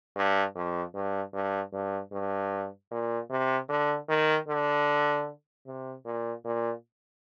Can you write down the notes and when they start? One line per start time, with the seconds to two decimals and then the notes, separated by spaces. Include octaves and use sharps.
0.16 G2
0.55 F2
0.94 G2
1.34 G2
1.73 G2
2.12 G2
2.91 A#2
3.30 C3
3.69 D3
4.09 D#3
4.48 D3
5.66 C3
6.05 A#2
6.45 A#2